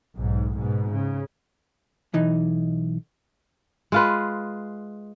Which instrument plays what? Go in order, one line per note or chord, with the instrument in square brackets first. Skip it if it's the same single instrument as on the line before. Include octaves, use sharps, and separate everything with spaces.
[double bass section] B1 G#2
G#2 B2
C#3
[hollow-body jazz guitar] B1 E3 D#4
[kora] G#3 F4 B4